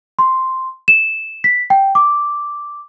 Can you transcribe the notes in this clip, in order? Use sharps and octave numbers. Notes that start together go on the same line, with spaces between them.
C6
E7
B6
G5
D6